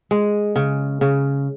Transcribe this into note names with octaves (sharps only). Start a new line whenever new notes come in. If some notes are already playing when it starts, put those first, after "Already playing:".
G#3
C#3
C#3